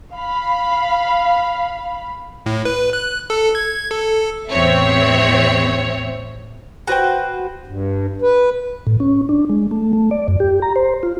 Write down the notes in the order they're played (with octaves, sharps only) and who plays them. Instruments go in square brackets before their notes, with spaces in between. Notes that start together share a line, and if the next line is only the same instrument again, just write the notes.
[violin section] F5 B5
[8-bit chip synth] A2
B4
F#6
A4
G#6
A4
[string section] A1 E2 C4 C#5 E5
[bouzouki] F#4 B4 C5 G5
[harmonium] G2
B4
[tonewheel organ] A2
C#4
D4
G#3
A3
A3
D5
F#2
G4
A#5
C5
F4